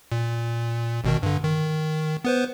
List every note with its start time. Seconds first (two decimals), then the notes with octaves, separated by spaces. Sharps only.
0.12 A#2
1.04 G#1 B2 D#3
1.23 G2 D3
1.44 D#3
2.24 B3 B4 C5